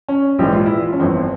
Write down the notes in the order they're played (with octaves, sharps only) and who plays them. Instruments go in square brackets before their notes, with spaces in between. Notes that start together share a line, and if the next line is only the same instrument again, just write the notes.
[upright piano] C#4
A#1 G#2 E3 G4
F4
E4
F4
C#4
G1 F2 E3 C4